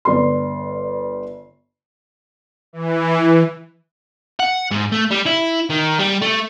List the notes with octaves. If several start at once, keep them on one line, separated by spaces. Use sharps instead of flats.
G1 D5 C6
E3
F#5
G#2
A3
G3
E4
D#3
G3
A3